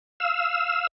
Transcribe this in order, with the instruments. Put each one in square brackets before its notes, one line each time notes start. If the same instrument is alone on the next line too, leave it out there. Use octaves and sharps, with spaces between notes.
[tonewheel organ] F5 E6